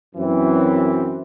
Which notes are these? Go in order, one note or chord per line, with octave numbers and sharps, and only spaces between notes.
F#2 E3 C4